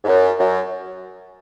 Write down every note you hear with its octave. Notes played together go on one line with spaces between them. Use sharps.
G#2
F#2
F#2